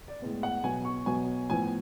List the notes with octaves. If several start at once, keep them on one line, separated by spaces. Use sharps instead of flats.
D5
A2 G#3 B3
F#5
B2 F#3 B3 G#5
C#6
B2 F#3 B3 G#5
A2 F3 B3 G#5